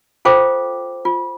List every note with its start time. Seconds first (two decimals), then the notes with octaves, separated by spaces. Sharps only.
0.25 F4 A4 C5 F5 G5 D6
1.05 F4